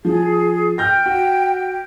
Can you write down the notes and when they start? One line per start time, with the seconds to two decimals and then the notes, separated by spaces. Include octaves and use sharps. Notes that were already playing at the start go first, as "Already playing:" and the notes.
0.05 F3 G#4
0.78 G5 F6 G6 A#6
1.06 F#4